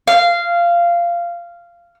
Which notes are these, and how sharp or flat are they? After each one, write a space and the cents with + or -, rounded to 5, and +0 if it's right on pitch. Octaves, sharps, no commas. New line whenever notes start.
F5 -15